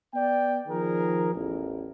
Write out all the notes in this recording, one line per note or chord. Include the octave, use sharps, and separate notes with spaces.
B3 D5 G5
D#3 F3 G#4 A#4
A1 E2